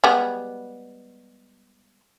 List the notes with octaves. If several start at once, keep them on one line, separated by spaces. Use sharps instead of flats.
G3 G#3 B3